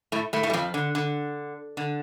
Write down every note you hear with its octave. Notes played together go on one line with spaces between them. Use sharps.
A2 A3
A2 A3
A2 A3
G3
F2 F3
D3
D3
D3